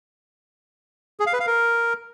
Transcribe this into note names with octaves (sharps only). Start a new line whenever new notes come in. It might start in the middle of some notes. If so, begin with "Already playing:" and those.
G#4
F5
B4
F5
A#4